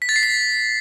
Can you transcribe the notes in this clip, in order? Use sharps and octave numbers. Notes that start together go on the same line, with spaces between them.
B6
A6
C7
B6